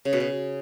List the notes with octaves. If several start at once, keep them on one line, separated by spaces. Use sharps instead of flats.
C#3
B2
C#3